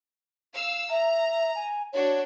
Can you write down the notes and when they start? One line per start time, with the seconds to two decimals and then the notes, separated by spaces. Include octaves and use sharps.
0.54 F5 E6
0.90 E5 A#5
1.55 G#5
1.93 D4 F#4 C#5